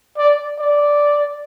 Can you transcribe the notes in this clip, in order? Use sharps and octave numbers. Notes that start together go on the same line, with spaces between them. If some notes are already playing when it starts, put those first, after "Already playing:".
D5
D5